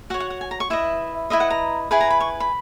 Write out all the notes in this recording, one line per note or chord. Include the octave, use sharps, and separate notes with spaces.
F#4 C#5 F#5
F#5
F#5
G#5
A#5
C#6
E4 B4 D#5 E5
E4 B4 D#5 E5
F#5
A#5
E4 G#4 B4 B5
A#5
B5
C#6
B5